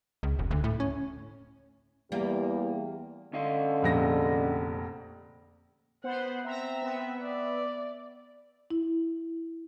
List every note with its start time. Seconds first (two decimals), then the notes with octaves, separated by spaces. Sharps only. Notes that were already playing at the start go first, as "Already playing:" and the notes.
0.23 C#2
0.39 E1
0.51 D2
0.64 A2
0.80 C#4
2.12 E2 G3 A#3 G4
3.33 D3 C#4 D#5 F5
3.83 F1 A#1 A#6
6.04 B3 C5 F#5
6.44 C4 E5 A#5
6.79 B3 E5
7.22 D5
8.70 E4